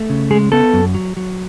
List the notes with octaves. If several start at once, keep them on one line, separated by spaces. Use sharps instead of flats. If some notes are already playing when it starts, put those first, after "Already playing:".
Already playing: A3
C#3
G#3 G#4
B3 A4
F#2
F#3
F#3